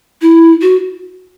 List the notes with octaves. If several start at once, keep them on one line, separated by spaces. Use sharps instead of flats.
E4
F#4